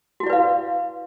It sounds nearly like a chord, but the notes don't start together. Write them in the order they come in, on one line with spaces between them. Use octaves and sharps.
F#4 E4 D5 B4 F5